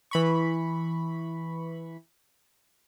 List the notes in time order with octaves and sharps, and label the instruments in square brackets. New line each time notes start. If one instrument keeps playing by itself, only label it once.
[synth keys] E3 B5 C#6